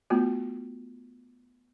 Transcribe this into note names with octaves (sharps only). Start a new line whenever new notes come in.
A3 B3 F4 F#4